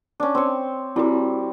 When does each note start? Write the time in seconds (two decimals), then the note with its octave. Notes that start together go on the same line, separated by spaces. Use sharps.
0.20 C#4 D4
0.35 C4 C#5
0.96 G3 C4 E4 F#4 A#4